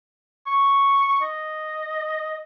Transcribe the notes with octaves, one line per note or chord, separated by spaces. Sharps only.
C#6
D#5